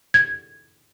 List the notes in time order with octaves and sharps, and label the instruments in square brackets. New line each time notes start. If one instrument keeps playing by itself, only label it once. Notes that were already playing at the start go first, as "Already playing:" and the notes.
[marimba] G#6